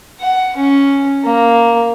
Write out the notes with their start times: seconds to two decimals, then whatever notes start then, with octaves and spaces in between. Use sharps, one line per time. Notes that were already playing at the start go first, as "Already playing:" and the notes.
0.21 F#5
0.57 C#4
1.24 A#3